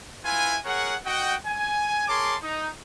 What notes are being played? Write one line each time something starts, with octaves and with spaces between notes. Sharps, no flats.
E4 F4 B4 E5 G#5
G#4 A#4 C#5 F#5
F#4 D#5 F#5 G5
G#5
G#4 A#4 C#5 A5 C6 D6
D#4